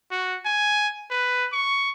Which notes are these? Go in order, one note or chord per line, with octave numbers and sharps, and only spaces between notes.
F#4
G#5
B4
C#6